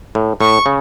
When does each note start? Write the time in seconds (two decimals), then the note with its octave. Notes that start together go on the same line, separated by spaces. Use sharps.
0.15 A2
0.41 A2 C#6
0.66 C#3